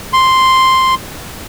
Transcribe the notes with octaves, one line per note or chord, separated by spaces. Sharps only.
C6